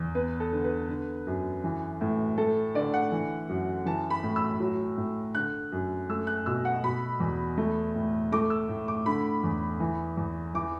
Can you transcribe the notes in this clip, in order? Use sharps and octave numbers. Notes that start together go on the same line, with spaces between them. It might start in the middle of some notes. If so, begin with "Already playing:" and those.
Already playing: E2
B3 B4
A4
D3
B4
D3
F#2
E3
A2
A3 A4
D3 D5
F#5
E3
F#2
E3 A5
B5
A2
E6
F#3
A2
D3 F#6
F#2
A3 E6
F#6
B2 E6
F#5
B2 B5
E2
A3
A2
A3 D6
E6
A2
D6
D3 B5
E2
E3
E2
E3 D6